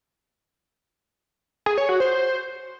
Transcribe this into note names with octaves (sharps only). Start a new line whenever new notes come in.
G#4
C#5
F#4
C5